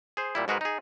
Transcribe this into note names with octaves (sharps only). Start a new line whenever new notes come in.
G#4 C5
A#2 G3 E4
G#2 G#3 F#4 G#4 A#4 B4
D#4 G#4